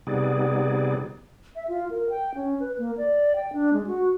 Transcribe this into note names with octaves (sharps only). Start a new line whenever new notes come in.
C3 G3 B3 D#4 G#4 D5
E5
F4
A#4
G5
C#4
B4
A#3
D5
G5
D4
G#3
F#4